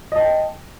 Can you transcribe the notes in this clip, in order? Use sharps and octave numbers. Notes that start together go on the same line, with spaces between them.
D#5 G5 A5